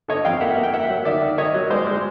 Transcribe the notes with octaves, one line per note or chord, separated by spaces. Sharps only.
D3 C#5 D#5
F2 F5 G5
A#3 E5 F#5
A#3
G5
A#3 E5 F#5
F#3
D#3 D5 E5
D#3
D#3 C#5 D#5
F#3
G#3 C5 D5
G#3